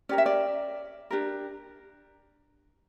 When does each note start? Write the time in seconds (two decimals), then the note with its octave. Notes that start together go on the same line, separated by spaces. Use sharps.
0.09 C#4 G4 A#4 D5
0.18 E5
0.26 D5
1.11 D4 G4 A#4